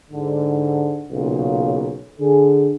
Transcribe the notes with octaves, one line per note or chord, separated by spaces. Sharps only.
G#2 D3
B1 A#2 C#3
D3 G#4